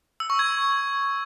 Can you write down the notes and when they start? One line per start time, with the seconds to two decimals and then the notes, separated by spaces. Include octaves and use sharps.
0.20 E6
0.30 C#6
0.39 G#6